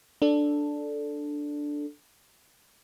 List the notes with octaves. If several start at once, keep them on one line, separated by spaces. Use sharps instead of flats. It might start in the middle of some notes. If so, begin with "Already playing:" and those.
D4 A4